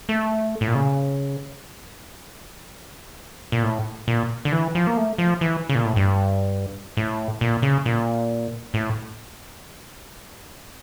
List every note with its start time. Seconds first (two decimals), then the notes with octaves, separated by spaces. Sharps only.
0.09 A3
0.61 A2
0.68 A#2
0.75 C#3
3.52 A#2
3.63 A2
4.08 A#2
4.45 D3
4.52 E3
4.75 F3
4.87 A#3
4.97 A3
5.18 F3
5.41 E3
5.69 C#3
5.75 A#2
5.85 A2
5.96 G2
6.97 A2
7.41 A#2
7.62 C#3
7.86 A#2
8.74 A2